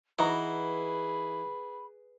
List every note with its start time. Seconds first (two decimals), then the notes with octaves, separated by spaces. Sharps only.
0.19 E3 D#4 F#4 G#4 B4 A#5 B5